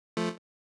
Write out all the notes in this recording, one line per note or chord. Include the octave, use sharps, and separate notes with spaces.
F3 A3